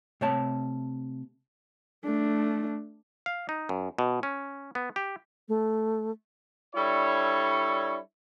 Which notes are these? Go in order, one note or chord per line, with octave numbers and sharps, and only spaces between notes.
C3 A3 C#5 A5
A3 D4
F5
D#4
F#2
B2
C#4
B3
G4
A3
G3 D4 E4 A4 C#5